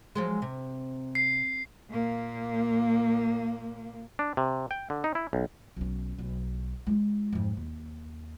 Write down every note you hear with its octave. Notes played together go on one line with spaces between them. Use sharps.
F3 F#3 G#3
C3
C7
A#2 A#3
D4
C3
G5
D3
D#4
E4
B1
B1 C#4
B1
G#3 F4
F2 G#2
D#2